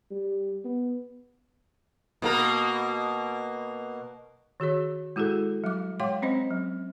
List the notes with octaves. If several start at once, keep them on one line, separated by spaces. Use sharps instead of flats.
G3
B3
B2 A#3 A#4
D#3 F#4 G#4 C#5
G#3 E4 F#4 G#4 A4
F#3 G3 D6
G#3 C#5 F5 G5 C6 D6
C4 C#4 C5 D#5
F#3